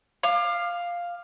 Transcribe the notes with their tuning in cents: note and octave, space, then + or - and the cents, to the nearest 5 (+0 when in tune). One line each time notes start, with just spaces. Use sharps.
F5 +0 D6 +35